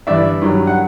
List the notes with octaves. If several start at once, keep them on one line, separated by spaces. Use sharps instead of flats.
G2 E3 D5 E5
G2 D#3 F#3
F#5